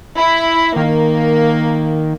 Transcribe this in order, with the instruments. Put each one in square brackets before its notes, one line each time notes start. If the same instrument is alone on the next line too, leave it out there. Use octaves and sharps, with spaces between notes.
[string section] E4
[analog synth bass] D#3 [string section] A#3